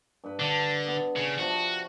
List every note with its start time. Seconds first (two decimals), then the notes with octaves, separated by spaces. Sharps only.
0.24 G2 B4
0.40 D3 D4
0.87 B3
1.16 C#3
1.39 C3 F3 F#4